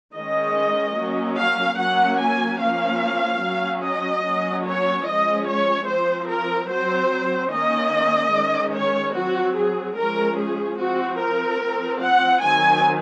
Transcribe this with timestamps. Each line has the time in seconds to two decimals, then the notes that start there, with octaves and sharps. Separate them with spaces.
0.14 D#3 G#3 C#4 D#5
0.96 F#3 A#3 C#4
1.37 F5
1.78 F#3 A#3 C#4 F#5
2.19 G#5
2.60 F3 A#3 C#4 F5
3.43 F#3 C#4
3.82 D#5
4.24 F#3 A#3 C#4
4.65 C#5
5.05 F3 G#3 C#4 D#5
5.47 C#5
5.87 F3 C4 C5
6.28 A#4
6.69 F#3 C4 C5
7.51 D#3 A#3 C#4 D#5
8.32 D#3 G#3 C#4
8.74 C#5
9.15 F#3 C4 F#4
9.56 G#4
9.96 F3 G#3 C#4 A#4
10.38 G#4
10.78 F3 C4 F#4
11.19 A#4
11.61 F3 C4
12.02 F#5
12.42 D#3 F#3 C4 G#5